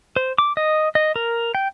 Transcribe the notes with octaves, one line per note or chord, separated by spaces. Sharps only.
C5
D6
D#5
D#5
A#4
G5